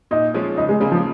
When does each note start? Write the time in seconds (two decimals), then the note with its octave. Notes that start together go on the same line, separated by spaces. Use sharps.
0.11 A#2 D#4
0.34 F3 G#3 C#4 F4
0.57 C#2 D#4
0.69 G#3
0.80 C#3 G#3 A#3
0.92 F3